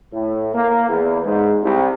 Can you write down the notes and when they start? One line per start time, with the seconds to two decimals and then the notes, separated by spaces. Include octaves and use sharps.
0.13 A2
0.54 A#3
0.88 E2
1.25 G#2
1.62 C2